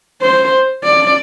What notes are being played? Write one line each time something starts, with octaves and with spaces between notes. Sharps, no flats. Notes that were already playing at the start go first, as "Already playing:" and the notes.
C5
D5